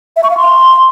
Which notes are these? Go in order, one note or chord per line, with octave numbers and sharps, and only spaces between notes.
E5
C#6
F5
C6